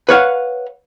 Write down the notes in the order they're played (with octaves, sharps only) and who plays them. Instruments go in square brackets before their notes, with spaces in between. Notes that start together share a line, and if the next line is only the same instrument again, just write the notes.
[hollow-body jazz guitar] B4 C#5 F5 F#5